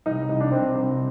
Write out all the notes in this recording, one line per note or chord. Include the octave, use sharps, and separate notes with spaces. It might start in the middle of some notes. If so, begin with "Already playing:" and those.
C2 D#4
C2
D4
C2 C4
C2